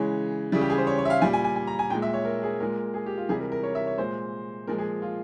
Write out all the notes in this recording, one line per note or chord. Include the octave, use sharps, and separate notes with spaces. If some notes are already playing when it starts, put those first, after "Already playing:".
Already playing: C#3 E3 G#3 C#5
C#3 E3 G3 E4
G4
G#4
C5
C#5
C#5
E5
F5
A#2 G3 G#5
G#5
G#5
G#5
A#5
G#5
A#2 G#3 G5
E5
C#5
A#4
G#4
A#2 G#3 A#4
G#4
G4
F4
C3 E3 G3 G#4
A#4
A#4
C#5
E5
C#5
A#2 G#3 C5
A#2 F3 G#3 A#4
G#4
F4